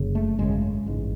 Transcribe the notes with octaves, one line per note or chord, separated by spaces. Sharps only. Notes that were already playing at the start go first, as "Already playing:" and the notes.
Already playing: F#1 F#2 C#3
A3
G#1 F#2 C#3 G#3
A1 G#2